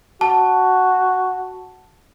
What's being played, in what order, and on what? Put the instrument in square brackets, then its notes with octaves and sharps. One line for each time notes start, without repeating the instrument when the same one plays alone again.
[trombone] F#4 [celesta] A5